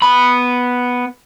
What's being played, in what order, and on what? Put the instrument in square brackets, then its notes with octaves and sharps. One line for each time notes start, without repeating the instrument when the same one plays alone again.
[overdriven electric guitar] B3 B5